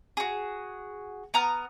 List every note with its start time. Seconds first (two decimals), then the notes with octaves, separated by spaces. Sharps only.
0.17 F#4 G#4
1.34 B3 A#5 D#6 F6